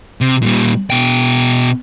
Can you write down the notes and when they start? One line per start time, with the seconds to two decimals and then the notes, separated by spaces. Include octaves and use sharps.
0.21 C3
0.43 A#2 G3
0.90 B2 G5